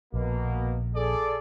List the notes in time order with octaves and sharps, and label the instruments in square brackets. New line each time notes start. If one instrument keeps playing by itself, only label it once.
[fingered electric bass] A#1 [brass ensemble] B2 A#3
[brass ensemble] G#4 A4 D5